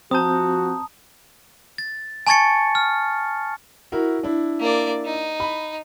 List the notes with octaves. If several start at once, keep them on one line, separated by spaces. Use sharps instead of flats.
F3 C4 F#4 A5 A#5 D#6 G6
A6
G#5 A5 C#6 G#6 A6 C#7
F6
E4 F#4 A#4
D4 E4
A#3 D5
D#4
B5